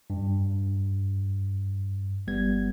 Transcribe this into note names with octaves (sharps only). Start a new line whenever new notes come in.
G2
G1 G3 B3 G#6